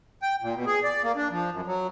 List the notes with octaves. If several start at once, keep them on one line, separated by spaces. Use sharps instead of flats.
G5
A#2
B2
G#4
D5
A#3
D4
F3
F#2
F#3